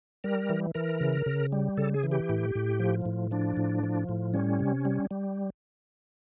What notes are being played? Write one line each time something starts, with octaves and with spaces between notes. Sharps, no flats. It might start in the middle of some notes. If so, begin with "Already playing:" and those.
G3 A#4
E3
E3 A#4
C#3
C#3
G3
C#3 A4
G#4
E3
G4
A2
A2
F3
A2
F3 D4
A2
F3
A2
G3 C#4
C3
G3
G3